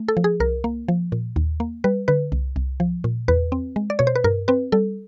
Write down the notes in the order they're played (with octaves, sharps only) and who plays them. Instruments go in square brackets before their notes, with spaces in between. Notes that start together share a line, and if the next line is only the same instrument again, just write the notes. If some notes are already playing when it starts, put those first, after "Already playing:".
Already playing: [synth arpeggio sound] A3
A4
F3
G#4
C2 A#4
A#3
F3
A#2
D#2
A#3
G3 B4
D3 B4
C2
C2
F3
A#2
E2 B4
C4
G#3
D5
B2 C#5
C5
B4
G2 A#4
C4 B4
G3 A4